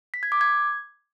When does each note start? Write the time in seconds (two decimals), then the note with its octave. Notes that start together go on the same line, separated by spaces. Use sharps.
0.14 B6
0.23 G#6
0.32 D6
0.41 G#6